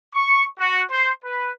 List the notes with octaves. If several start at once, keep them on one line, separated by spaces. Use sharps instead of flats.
C#6
F#4
C5
B4